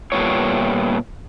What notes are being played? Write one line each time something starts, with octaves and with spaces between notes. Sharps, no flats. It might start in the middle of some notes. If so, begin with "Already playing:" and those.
A#2 G3 A3 B3 F4 C#5